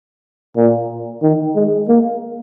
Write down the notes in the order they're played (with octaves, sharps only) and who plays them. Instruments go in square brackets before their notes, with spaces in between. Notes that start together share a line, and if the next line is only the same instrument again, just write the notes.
[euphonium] A#2
D#3
G#3
A#3